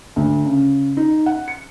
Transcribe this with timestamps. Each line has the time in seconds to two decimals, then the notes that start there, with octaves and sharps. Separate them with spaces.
0.16 D2
0.45 C#3
0.97 D#4
1.26 F#5
1.48 C#7